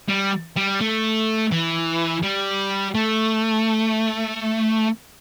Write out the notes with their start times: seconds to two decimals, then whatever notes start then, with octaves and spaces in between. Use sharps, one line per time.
0.09 G3
0.56 G3
0.81 A3
1.52 E3
2.23 G3
2.95 A3